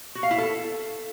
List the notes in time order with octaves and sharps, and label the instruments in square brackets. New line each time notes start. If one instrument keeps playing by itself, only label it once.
[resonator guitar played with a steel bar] F#4
F5
E4
A4